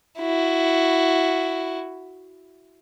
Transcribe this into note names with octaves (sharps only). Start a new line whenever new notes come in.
E4 F#4